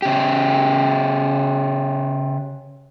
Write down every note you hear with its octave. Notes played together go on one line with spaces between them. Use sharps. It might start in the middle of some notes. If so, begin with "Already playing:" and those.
C#3 G4